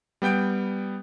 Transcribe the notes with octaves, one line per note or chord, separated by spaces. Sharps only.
G3 B3 G5 G6 D7